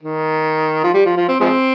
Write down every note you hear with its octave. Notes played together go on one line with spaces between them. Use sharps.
D#3
F3
G3
F3
F3
C4
F3 G#3 C4